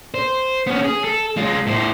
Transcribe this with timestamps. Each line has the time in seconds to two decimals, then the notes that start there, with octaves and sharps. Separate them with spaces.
0.14 C5
0.67 B3 C#4
0.84 G#4
1.04 A4
1.37 G#3 F4
1.67 A2 C5